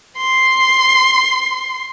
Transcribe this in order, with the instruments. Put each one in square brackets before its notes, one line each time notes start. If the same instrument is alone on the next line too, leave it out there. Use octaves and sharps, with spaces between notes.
[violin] C6 C7